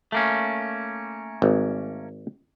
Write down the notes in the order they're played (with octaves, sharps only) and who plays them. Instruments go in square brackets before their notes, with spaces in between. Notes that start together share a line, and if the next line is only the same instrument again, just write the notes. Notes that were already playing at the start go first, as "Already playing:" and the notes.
[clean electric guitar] A3 A#3 C#4
[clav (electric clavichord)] G#1